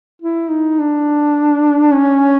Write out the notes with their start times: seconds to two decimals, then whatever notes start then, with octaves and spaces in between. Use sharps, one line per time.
0.22 E4
0.50 D#4
0.79 D4
1.93 C#4